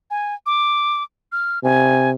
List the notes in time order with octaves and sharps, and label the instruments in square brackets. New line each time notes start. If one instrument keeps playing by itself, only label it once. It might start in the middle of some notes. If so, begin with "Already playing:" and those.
[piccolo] G#5
D6
F6
[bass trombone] C3 [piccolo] G#5